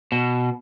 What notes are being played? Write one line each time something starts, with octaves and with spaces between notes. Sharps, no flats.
B2